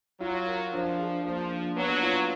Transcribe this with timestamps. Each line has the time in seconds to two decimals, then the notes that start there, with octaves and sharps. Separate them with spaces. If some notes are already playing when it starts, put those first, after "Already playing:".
0.20 F#3 F4
0.46 A#4
0.73 F3 D4
0.99 G#4
1.24 F3 A#3
1.51 D4
1.76 F#3 B3
2.03 F4